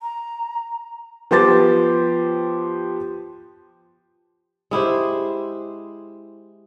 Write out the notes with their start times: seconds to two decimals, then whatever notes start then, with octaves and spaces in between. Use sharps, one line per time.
0.01 A#5
1.31 F3 B3 G4 C5 D6 A6
4.71 G#3 E4 G4 C5